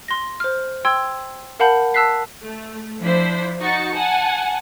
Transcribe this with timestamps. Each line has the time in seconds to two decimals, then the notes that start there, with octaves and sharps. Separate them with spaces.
0.08 C6 A#6
0.40 C5 F6
0.85 G5 C6 E6 G#6
1.60 A#4 F5 F#5 A5 B5 G6
1.94 A5 E6 F#6 B6 C7
2.44 A3
3.02 F3 D4 E4 C5 B6
3.62 D#4 F#4 C#6 A6 C#7
3.95 F#5 G#5 A5